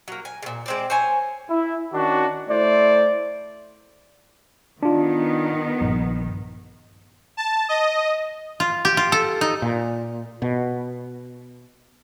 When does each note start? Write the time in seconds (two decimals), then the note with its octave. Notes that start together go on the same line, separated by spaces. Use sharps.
0.08 F#3 A#3
0.25 G#5
0.42 A#2 C#3
0.66 G#3 C4 D5
0.90 C5 C#5 G#5
1.50 E4
1.94 D#3 C#4 D4 F#4
2.49 A3 E4 C5 D5
4.83 D#3 B3 D4 F4
5.81 A#1 G2
7.37 A5
7.69 D#5
8.60 F4
8.85 G4
8.97 F4
9.12 A4
9.41 D#4
9.62 A#2
10.42 B2